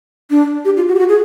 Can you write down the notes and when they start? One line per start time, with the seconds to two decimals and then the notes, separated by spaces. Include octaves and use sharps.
0.30 D4
0.65 G4
0.77 F4
0.88 F#4
0.95 G4
0.99 F#4
1.09 G#4